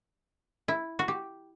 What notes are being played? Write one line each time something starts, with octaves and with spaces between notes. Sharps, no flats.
E4
F#4
G4